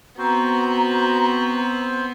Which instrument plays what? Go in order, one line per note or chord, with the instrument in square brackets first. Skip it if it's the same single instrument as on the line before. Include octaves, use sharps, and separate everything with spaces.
[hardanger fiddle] B3 [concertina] C4 C5 [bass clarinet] F#4 [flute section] A#5